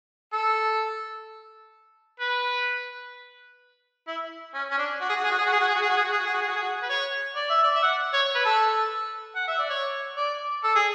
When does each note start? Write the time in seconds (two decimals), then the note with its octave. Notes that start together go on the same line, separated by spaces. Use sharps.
0.33 A4
2.20 B4
4.07 E4
4.54 C#4
4.71 C#4
4.78 D4
5.01 F#4
5.09 G#4
5.16 F#4
5.24 G#4
5.31 F#4
5.38 G#4
5.46 F#4
5.52 G#4
5.61 F#4
5.68 G#4
5.75 F#4
5.82 G#4
5.89 F#4
5.97 G#4
6.04 F#4
6.12 G#4
6.19 F#4
6.26 G#4
6.34 F#4
6.41 G#4
6.48 F#4
6.56 G#4
6.63 F#4
6.82 B4
6.89 C#5
7.36 D5
7.50 E5
7.64 D5
7.75 E5
7.83 F#5
8.14 C#5
8.35 B4
8.45 A4
9.36 F#5
9.48 E5
9.59 D5
9.70 C#5
10.17 D5
10.64 A4
10.75 G#4